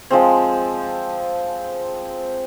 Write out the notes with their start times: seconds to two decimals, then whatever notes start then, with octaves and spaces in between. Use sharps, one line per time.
0.11 F3 G#3 C4